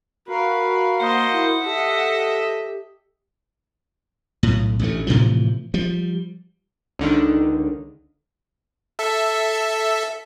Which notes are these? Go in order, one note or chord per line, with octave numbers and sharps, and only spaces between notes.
F#4 A#4 B4 F5
A#3 C5 D#5 F#5
E4
G4 A4 D#5 E5
B1 A2
A1 D2 F#3 A3
A2 C3 E3 F3
F3 G3
C#2 D3 D#3
A4 E5